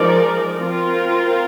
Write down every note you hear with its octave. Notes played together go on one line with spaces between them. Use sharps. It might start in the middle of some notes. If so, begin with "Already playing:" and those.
Already playing: F3 G#3 D#4 A#4 D5
C4 F4 A#4